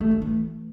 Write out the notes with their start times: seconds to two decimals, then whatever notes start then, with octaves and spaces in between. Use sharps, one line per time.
0.01 A3
0.11 D3
0.22 E3